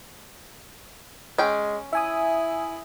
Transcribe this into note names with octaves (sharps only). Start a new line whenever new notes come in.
G#3 C#4 G5
E4 E5 G#5 D#6